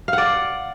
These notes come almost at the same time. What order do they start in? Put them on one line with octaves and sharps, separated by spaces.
F5 F#5 D5